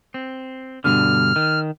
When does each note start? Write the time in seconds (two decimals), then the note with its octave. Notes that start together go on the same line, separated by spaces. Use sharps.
0.14 C4
0.84 G2 B2 D3 F6
1.36 D#3